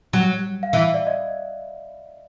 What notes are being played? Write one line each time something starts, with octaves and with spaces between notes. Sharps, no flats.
F#3
F5
E3 E5
D5
D#5